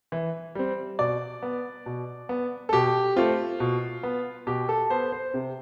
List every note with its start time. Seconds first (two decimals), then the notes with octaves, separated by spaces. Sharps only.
0.12 E3
0.55 G3 C4
0.99 B2 D5
1.43 B3
1.86 B2
2.29 B3
2.69 A4
2.73 B2 G4
3.16 A3 C4 F4
3.60 B2
4.03 B3
4.47 B2 G4
4.69 A4
4.90 B3 C5
5.12 C5
5.34 C3